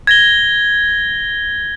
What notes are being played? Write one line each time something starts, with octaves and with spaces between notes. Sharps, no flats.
G#6 A#6 G7